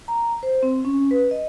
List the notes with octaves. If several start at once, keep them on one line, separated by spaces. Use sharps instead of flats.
A#5
C5
C4
C#4
B4
D#5